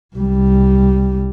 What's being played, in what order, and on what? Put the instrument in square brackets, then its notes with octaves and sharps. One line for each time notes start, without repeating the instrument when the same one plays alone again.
[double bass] C2 G3